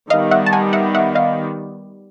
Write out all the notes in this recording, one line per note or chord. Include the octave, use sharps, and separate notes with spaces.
D#3 G3 B3 D#5 F5
E5 F#5
A5
F#5 G#5
E5 F#5
E5 F#5
D#5 F5